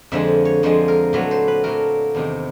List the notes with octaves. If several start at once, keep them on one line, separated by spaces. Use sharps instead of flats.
F2 D3 F3 G#3 E5
C#5
F2 D3 F3 G#3 C5
A#4
A#2 F#3 A3 B4
C5
B4
A#2 F#3 A3 A#4
E2 C3 D#3